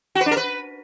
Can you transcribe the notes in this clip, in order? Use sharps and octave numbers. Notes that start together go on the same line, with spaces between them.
F#4
B4
D4
A#4
B4